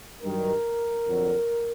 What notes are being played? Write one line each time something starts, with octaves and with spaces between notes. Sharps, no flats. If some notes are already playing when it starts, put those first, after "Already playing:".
G2 D#3 F#3 A#4
F2 D3 F#3